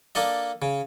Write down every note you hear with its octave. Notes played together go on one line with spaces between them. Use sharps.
A#3 D4 A4 D#5
C#3